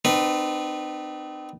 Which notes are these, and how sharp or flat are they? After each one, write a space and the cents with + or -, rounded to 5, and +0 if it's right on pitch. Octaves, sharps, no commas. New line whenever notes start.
C4 -35 D#4 -40 B4 -15